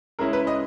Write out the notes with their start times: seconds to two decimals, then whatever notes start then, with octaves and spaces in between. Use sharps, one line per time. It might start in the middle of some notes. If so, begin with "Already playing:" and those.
0.19 C#3 G#3 C#4 E4 A#4
0.33 B4
0.47 D#5